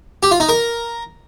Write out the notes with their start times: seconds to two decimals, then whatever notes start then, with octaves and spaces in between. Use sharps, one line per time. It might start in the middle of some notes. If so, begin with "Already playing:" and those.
0.23 G4
0.31 F4
0.40 D#4
0.49 A#4